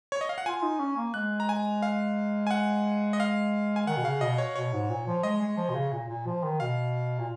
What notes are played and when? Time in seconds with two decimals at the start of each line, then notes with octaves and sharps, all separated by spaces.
0.12 C#5
0.21 D#5
0.29 F5
0.38 F#5
0.46 F4 G#5
0.63 D#4
0.80 C#4
0.97 A#3
1.14 G#3 F#6
1.40 A#5
1.49 G#5
1.82 F5
2.47 G#5
2.51 F#5
3.13 D#5
3.20 F5
3.76 G#5
3.87 D#3 F#5
3.97 B2
4.04 C#3 F5
4.21 B2 D#5
4.38 C#5
4.56 B2 C#5
4.73 G#2
4.90 A#2
5.07 F3
5.23 G#3 D#5
5.41 G#3
5.57 F3
5.70 B2
5.75 C#3
5.93 A#2
6.09 A#2
6.27 F3
6.44 D#3
6.60 B2 F5
7.20 A#2